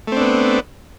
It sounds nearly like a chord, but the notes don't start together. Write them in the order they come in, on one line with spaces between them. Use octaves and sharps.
A3 C4 D4 B3